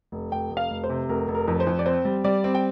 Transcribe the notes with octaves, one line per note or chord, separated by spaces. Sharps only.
F1
F1 G5
F1
F5
F1
C5
C3
F1 A#4
F1
A#4
F2
C5
F2
D5
C4 C5
G3
G3 D5
C4
G5